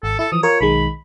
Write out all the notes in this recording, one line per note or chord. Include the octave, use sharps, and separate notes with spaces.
G#1 A4
E4 A4
E3 F3 D#6
F4 A#4 C#5
B1 D#3 G#3 B5